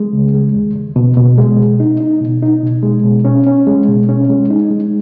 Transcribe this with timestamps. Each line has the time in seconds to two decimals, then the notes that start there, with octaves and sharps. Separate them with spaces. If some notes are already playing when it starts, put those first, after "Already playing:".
Already playing: G#3
0.13 C#3
0.34 G#3
0.55 D#2
0.76 D#2
0.96 B2
1.17 B2
1.38 G#3
1.58 B2
1.80 D#4
2.00 D#4
2.21 B2
2.42 D#4
2.63 B2
2.83 G#3
3.04 B2
3.25 C#4
3.47 C#4
3.67 G#3
3.88 B2
4.09 C#4
4.30 G#3
4.50 D#4
4.71 G#3